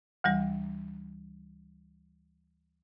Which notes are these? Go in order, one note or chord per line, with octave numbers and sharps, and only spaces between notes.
D2 E3 G3